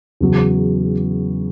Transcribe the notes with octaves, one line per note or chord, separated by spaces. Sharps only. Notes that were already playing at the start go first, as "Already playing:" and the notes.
E2 C#3 F#3